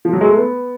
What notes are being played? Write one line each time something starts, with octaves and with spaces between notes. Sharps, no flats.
F3
F#3
G#3
A3
B3